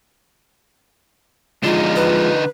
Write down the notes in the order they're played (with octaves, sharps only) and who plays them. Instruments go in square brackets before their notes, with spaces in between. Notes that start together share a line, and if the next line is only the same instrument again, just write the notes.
[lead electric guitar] D3 D#4 [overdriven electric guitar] F3 G#3 [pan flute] F4
[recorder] B4